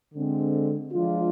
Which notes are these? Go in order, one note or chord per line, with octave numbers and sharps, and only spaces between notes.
D3 G#3 C4
F3 G#3 D4 F4